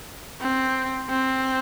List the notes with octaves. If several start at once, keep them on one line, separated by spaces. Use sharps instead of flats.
C4
C4